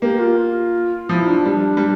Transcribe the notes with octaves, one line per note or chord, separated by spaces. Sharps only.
A#3 G4
F4
F4
F3 E4
D4
G3
G3